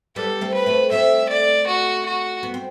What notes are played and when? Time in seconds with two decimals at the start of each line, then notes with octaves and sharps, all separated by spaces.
0.16 G3 B3 A4
0.41 A3 C4
0.54 B4
0.66 A3 C4
0.91 A3 C4 E5
1.30 D5
1.67 F#4
2.06 F#4
2.43 B3
2.54 C4